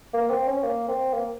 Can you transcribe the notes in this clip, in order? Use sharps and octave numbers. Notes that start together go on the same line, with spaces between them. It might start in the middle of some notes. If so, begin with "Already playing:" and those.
A#3
C4
C#4
A#3
C4
A#3